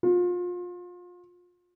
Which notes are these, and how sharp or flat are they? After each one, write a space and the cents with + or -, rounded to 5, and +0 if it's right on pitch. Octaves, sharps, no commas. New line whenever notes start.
F4 +30